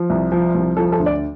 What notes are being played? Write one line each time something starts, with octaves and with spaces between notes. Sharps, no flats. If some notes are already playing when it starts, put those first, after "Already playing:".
Already playing: F3
C2
F3
C2
F3 A4
A4
D2
D5